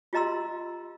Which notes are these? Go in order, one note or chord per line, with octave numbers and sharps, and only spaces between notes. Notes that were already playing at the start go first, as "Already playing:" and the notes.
F4 G4 D#5 A#5 C6 E6